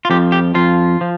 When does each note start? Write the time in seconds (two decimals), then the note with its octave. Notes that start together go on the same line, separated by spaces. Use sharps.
0.05 F4
0.10 F2 F3 G4
0.32 G4
0.54 F2 F3 F4
1.01 F3